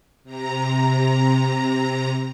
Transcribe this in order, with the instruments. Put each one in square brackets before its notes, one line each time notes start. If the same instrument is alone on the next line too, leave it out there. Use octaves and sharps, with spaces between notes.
[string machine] C3 A#5